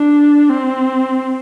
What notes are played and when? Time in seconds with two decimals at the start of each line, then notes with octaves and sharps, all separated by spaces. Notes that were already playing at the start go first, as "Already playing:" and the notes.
Already playing: D4
0.49 C4